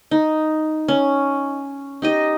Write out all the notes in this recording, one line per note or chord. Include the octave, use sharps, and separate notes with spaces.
D#4
C#4
D#4 G4 D#5